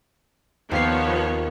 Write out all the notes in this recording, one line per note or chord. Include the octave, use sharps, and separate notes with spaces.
D#2 F3 B3 C#5 F5 C7